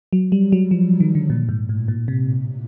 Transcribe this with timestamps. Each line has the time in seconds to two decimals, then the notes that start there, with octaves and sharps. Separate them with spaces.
0.13 F#3
0.32 G3
0.52 F#3
0.71 F3
1.00 D#3
1.15 D3
1.30 A#2
1.49 G#2
1.69 A2
1.88 A#2
2.08 C3